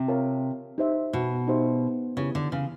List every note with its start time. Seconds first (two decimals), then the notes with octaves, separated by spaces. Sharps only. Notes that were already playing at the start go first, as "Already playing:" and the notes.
Already playing: C3
0.08 F4 A#4 C#5 F5 A5
0.78 D#4 G4 C5 E5
1.13 B2
1.48 D#4 G4 C5 E5
2.17 C#3 E4 G4 B4
2.35 D3
2.52 C#3